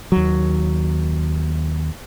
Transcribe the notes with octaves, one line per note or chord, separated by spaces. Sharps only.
D#2 F#3